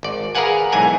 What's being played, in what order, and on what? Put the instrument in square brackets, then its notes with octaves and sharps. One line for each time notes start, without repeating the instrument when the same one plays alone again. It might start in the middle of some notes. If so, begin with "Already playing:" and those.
[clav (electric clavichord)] G#1 D5
G#4 A#4 B4 F5 F#5 G#5
B1 G#2 E3 G#5 A#5